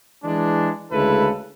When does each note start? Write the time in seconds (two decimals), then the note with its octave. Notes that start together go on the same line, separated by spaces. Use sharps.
0.24 E3 G#3 D4
0.92 D2 C#3 G#3 E4 A4 B4